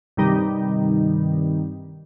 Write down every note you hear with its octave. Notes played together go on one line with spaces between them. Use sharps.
G2 C3 D#3 G3 D#4